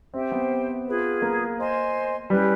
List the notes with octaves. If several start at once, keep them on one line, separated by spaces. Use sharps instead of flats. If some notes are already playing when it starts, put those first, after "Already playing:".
C4 G4 C5 E5 G5
B3
F4 G#4 B4
A#3
C5 D#5 G#5 C6
G3 C#4 E4 G4 B4